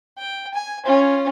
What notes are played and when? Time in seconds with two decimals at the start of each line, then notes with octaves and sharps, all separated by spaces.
0.18 G5
0.54 G#5
0.85 C#4 F4